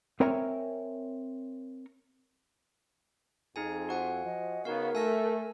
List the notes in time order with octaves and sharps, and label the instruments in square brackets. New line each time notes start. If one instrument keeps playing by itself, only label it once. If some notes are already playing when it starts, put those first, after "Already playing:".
[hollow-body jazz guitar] C4 A#4 C#5 E5 G#5 A#5
[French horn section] F2 [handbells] D#4 G#4 G#5
[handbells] F#4 F#5 G#5 [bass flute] C5
[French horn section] F3 [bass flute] D#5
[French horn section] C#3 B3 [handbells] D#4 F#4 F5 [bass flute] A#4
[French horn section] A3 [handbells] G#5 E6 A#6